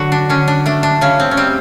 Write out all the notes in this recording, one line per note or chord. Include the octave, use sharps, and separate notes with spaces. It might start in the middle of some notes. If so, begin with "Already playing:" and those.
Already playing: D3 F#3 F#4
D4
D3 C#4
D4
A3 D4
D4
C#3 C#4
C4
C#4
G3 C4